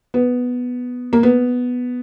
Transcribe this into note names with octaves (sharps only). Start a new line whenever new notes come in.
B3
A#3
B3